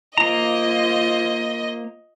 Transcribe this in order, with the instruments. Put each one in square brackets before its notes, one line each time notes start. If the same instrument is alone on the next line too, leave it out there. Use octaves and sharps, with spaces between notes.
[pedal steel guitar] A#3 A#5 [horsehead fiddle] F4 C5 [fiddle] D#5